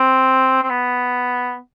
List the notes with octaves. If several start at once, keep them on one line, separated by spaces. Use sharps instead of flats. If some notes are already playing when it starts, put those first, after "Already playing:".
Already playing: C4
C4
B3